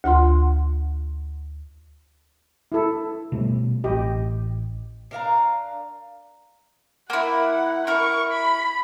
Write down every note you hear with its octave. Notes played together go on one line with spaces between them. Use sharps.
D2 F4 F#5 C6
E4 A4
B2 G3 A3
A1 G4 D#5
D4 A#4 F5 A#5
A#3 E4 F#5
E4 A#4 C#6
B5